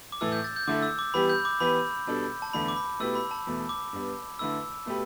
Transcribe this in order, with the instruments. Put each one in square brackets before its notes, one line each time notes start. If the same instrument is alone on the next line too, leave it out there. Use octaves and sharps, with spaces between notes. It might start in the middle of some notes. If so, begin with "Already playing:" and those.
[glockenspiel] D6
[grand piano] A2 E3 A3 [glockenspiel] E6
[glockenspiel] G6
A6
G6
[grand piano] D3 A3 E4 A4 [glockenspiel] D6
[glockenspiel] E6
D6
[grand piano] E3 G3 B3 G4 [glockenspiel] B5
[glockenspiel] G6
D6
[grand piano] E3 B3 G4 B4 [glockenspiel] B5
[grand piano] B2 G3 D4 A4
[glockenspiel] A5
[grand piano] E2 D3 A3 D4 [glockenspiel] B5
[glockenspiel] D6
B5
[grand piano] B2 A3 E4 G4 B4 [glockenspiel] E6
[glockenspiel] B5
A5
[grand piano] E2 B2 A3
[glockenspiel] D6
[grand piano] G2 G3 B3
[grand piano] D3 A3 E4 B4 [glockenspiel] E6
[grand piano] B2 A3 G4 B4